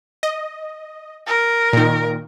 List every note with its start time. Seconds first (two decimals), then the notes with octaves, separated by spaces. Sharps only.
0.23 D#5
1.27 A#4
1.73 A#2 D#3